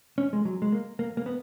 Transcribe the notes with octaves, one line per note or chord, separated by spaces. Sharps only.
C#4
G#3
F#3
G#3
A#3
A#3
A#3
B3